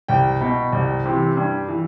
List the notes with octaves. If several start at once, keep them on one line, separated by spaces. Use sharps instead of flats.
C2 G5
B2
C2
C3 E3
G2
E3